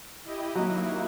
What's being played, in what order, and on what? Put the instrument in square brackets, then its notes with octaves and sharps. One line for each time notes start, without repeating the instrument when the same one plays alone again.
[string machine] E4 G4 D#5
[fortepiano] F#3 [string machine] A#3 D#4 E4